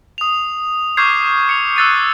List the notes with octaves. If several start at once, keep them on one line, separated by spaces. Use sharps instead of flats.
D#6 F7
C#6 D6 F6 G6 G#6 C7
C#7 F7
E6 F#6 A6 C7 D#7